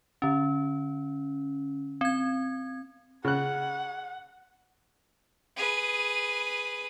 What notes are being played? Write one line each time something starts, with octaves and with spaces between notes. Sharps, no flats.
D3 C#4
C4 G#6
C#3 F#5 F#6
G#4 B4